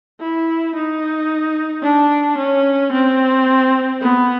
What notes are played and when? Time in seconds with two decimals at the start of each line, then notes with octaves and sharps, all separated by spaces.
0.20 E4
0.75 D#4
1.83 D4
2.38 C#4
2.93 C4
4.01 B3